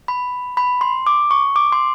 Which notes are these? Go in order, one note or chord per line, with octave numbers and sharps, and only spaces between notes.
B5
B5
C6
D6
C#6
D6
C6